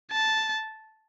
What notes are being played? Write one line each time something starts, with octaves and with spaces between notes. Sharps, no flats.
A5